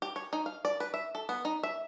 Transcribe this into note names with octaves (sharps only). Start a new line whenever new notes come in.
G4
C#5
D#4
F5
D5
B4
E5
A4
B3
D#4
E5